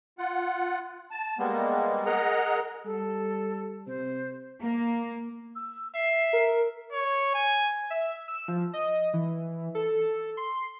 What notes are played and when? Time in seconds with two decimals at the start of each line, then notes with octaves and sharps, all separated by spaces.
0.18 F4 F#5
1.11 A5
1.38 G3 G#3 A#3 B3
2.06 G#4 A#4 D#5 F#5 A#5
2.85 G3 A4
3.87 C3 C5
4.60 A#3
5.56 E6
5.95 E5 C7
6.33 A#4
6.92 C#5
7.34 G#5
7.90 E5
8.28 E6
8.48 F3
8.73 D#5
9.14 E3
9.75 A4
10.37 C6